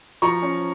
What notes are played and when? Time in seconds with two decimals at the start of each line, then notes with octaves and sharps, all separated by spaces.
0.22 F3 A#5 C#6
0.42 C#4